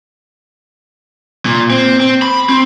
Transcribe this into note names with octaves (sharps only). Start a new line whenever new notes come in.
A#2
C4
C4
B5
C4